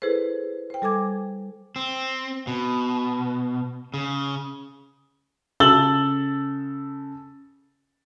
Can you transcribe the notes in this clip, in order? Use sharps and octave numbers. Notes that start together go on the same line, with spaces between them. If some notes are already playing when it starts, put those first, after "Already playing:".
E4 G#4 A4 B4 C5
C5 G5
G3 A4 G#5 D6 G#6
C4
B2
C#3
C#3 A4 E6 A6 F#7 G7